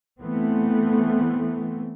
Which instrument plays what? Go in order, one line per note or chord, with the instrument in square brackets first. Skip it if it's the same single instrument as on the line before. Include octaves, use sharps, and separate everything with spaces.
[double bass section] E3 A3 B3 C4